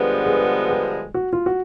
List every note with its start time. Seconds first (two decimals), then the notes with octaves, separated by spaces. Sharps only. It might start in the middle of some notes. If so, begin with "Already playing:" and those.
Already playing: G2 D3 F3 G#3 B3
0.26 G#4
0.70 G4
1.14 F#4
1.33 F4
1.46 F#4